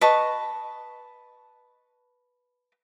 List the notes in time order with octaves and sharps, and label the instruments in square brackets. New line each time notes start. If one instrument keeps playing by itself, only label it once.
[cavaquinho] B4 D#5 A5 C#6